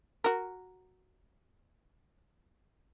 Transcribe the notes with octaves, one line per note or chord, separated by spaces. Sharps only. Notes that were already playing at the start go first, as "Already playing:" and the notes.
F#4 A#4